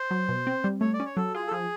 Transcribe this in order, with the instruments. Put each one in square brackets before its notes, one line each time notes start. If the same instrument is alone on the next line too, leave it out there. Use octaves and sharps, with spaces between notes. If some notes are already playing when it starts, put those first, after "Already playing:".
Already playing: [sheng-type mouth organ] C5
[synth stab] F#3
B2
C4
G3
[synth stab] A3 [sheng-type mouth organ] C#5
[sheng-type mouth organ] D5
[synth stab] C#4
[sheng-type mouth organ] C#5
[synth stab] F#3 [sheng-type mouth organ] A4
[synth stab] F4 [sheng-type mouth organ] G#4
[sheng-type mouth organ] A4
[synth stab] F3 [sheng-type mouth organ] G#4